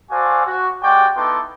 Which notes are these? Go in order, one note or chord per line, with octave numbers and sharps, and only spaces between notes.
F#4 A4 C5 D5 F5 G#5
F#4
G#3 F#4 G4 D5 G5
B3 D#4 E4 A4 C6 D6